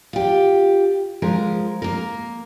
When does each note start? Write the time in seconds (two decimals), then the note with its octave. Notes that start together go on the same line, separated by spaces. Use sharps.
0.13 F4 G4
1.22 F3 G#3 A#4
1.82 A#3 A#4